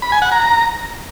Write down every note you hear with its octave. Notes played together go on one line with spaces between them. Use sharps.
B5
G#5
F#5
A#5